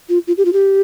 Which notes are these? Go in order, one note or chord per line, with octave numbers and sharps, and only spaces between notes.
F4
F4
G4
F4
G4